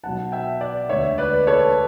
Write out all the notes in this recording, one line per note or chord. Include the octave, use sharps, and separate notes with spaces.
B1 B2 F#3 F#5 A5
E5 G5
D5 F#5
E1 D2 D3 C#5 E5
B4 D5
A4 C#5